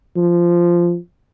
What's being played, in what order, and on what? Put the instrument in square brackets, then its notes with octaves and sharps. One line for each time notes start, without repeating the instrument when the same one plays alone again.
[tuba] F3